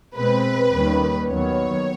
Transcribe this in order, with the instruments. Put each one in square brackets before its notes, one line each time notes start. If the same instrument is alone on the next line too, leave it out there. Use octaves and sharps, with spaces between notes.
[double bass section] B2 G#3 C4 [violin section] B4
[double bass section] D#2 D#3 G3 A#3 C#4
[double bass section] D#2 D#3 F#3 B3 [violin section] C#5